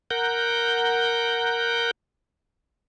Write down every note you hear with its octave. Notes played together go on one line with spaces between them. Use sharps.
A#4 F#5 G6